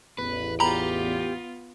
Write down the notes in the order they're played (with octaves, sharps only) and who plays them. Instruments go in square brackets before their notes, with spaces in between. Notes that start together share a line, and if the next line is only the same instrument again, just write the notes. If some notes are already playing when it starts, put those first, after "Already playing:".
[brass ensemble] A1 E2 [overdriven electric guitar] B4
[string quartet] B3 F4 [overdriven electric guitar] G4 [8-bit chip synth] A#5 B5